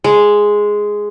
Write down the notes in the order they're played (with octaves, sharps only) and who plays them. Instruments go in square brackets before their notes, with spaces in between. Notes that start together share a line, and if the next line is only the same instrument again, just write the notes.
[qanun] G#3